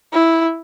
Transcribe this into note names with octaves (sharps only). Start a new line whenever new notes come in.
E4